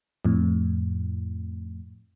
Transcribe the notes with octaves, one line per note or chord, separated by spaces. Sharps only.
F2 A2